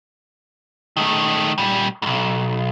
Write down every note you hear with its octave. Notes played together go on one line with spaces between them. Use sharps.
D#3 A3
A#2 G3
B1 G#2